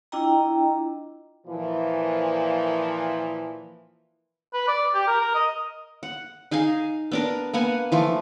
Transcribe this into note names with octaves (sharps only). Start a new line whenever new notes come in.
D4 E4 F4 D#5 G5 A#5
A#2 E3 F3
B4
D5
G4
A#4
A#4
D#5
F#5
D#4 G#4 F5 G#5
B3 D4 A#4
A#3 B3 F#5 G#5
E3 F3 A3